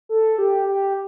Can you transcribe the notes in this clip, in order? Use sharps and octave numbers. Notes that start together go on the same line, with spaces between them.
A4
G4
G4